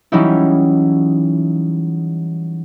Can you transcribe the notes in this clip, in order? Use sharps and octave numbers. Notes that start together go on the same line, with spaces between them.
E3 F#3 G3 C#4 D#4 E4